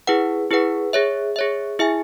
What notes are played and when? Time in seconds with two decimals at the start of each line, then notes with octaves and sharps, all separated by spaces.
0.07 E4 G#4 B4 F#5
0.51 E4 G#4 B4 F#5
0.93 G#4 C#5 E5
1.36 G#4 C#5 E5
1.79 E4 G#4 E5 G#5